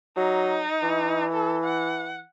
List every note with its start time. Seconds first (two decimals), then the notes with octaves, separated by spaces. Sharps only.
0.17 F#3 D#4
0.83 E3
1.33 A4
1.64 F#5